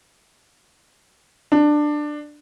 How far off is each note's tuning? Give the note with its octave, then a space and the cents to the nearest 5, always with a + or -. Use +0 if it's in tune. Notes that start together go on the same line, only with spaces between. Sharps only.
D4 +15